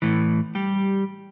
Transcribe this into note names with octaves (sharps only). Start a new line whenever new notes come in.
A2 E3
G3 G4